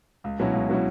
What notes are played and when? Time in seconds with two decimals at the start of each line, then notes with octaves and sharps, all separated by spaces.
0.24 C#2
0.39 B2 F#3 C#4 E4
0.54 C#2
0.69 B2 F#3 C#4 E4